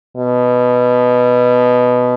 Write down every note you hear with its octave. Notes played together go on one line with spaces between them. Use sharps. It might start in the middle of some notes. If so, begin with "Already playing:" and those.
B2